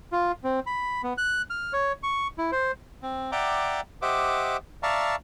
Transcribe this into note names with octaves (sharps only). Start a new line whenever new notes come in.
F4
C4
B5
B3
F#6
F6
C#5
C#6
E4
C5
C4
D5 E5 F#5 G5 A#5 D6
G4 C5 D#5 E5 F#5 D6
D5 E5 F5 A5 A#5 C#6